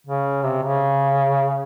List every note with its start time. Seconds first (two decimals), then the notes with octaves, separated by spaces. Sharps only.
0.06 C#3
0.44 C3
0.63 C#3